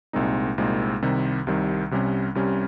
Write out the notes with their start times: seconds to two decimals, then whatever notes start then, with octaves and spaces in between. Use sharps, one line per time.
0.13 C2 A#2 G#3 C4 D#4
0.58 C2 A#2 G#3 C4 D#4
1.02 C2 C3 D#3 G3
1.47 C2 C3 D#3 G3
1.91 C2 C3 G3 C#4
2.35 C2 C3 G3 C#4